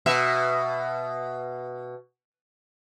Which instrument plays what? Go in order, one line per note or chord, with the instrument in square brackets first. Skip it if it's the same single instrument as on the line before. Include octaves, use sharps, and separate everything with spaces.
[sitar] B2 E5